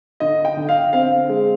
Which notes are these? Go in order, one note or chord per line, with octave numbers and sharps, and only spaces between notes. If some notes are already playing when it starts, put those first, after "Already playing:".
D3 D#5
G5
D3
F5
C4 F5
G#3